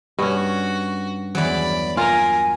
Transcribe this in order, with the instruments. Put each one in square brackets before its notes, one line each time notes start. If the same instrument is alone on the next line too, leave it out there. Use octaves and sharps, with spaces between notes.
[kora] G2 C#4 [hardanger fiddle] F#4
[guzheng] E2 F#3 [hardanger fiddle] D5 B5
[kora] F4 [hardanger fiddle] A#4 [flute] G#5